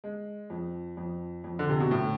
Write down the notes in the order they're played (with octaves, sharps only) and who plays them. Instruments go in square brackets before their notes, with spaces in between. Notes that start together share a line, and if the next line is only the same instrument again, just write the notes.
[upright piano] G#3
F2
F2
F2
[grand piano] D3
C3
B2
[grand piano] A2 [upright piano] D3